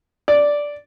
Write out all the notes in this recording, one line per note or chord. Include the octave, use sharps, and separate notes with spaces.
D5